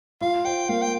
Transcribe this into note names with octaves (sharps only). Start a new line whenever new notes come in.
F4 F5
C5 G5
A#3 F5
G5